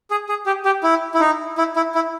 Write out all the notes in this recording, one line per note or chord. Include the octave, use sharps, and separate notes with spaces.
G#4
G#4
G4
G4
E4
E4
D#4
E4
E4
E4